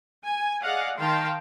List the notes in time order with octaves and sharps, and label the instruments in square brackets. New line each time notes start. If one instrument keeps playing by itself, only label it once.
[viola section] G#5
G#4 D5 D#5 F5 F#5
D#3 F5 G5 A5 C6